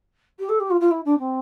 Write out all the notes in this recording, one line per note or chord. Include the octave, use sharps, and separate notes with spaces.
G4
A4
G4
F4
F4
E4
D4
C4